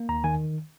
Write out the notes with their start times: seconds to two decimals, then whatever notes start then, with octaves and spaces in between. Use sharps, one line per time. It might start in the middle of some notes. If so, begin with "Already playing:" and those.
Already playing: A#3
0.09 D#2 A#5
0.24 D#3 G#5